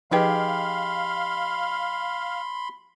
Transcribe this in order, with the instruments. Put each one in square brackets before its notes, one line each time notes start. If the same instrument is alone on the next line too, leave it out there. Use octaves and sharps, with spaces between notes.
[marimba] F3 B4 [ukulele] D#4 G4 G#4 [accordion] F5 [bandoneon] B5 C6